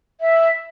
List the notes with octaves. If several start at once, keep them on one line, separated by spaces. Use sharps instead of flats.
E5